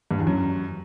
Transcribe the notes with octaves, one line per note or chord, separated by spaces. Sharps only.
G2
E2
F#2